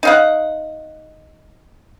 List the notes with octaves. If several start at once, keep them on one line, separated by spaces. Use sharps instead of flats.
D#4 F5 F#5